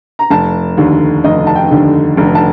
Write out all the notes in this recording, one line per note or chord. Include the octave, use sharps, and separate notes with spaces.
A#5
F1 A5
D#2 D3
F1 D#5
A5
G5
D#2 D3
F1
A#5
A5